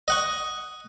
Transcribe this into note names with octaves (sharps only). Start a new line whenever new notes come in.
D#5 F#5 C#6